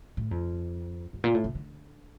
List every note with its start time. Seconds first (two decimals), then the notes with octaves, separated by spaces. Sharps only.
0.17 A2
0.31 F2
1.13 G2
1.24 A#2
1.35 A2
1.44 C#3
1.55 D3